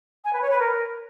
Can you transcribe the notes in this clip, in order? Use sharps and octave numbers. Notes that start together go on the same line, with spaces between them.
G#5
B4
C#5
B4
A#4